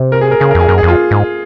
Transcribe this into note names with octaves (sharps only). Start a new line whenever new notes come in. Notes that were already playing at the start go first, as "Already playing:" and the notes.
Already playing: C3
A#4
G#4
A#4
C#3 G#4
A#4
F2 G#4
F#2 A#4
G#4
F2
F4
G#2